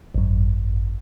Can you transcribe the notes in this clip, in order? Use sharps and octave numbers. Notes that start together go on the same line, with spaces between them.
G#1 F#2